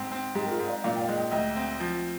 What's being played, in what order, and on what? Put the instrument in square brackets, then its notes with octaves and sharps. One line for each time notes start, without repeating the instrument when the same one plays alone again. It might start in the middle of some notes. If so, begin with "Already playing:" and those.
Already playing: [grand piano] G#2 C4
C4
[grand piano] G#2 [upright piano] G4
[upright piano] A#4
F4 G#4
[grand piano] G#2
[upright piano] D5 F5
[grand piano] A#2 [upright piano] D5 F5
[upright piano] G5
D5 F5
[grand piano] G#3
[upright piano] D#5 G5
[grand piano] D2 [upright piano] D#5 G5
[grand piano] C4
F3